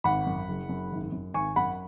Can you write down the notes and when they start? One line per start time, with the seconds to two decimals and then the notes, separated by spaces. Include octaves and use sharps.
0.04 G#1 F#5 B5
0.27 F#2
0.48 F#1
0.69 F#2
0.91 G#1
1.12 F#2
1.34 G#1 G#5 C#6
1.56 F#2 F#5 B5